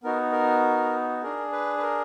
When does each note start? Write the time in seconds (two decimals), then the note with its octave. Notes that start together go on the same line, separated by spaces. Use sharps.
0.03 B3 D#4 F#4 A#4
0.32 A#4
1.23 D4 G#4 A#4
1.52 B4
1.78 B4
1.82 A#4